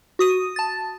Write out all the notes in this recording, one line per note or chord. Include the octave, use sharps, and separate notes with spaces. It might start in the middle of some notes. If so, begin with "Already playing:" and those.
F#4 D#6 D#7
A5 A6